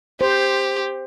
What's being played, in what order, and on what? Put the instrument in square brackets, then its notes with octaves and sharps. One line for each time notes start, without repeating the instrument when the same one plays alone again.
[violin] G4 [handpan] C5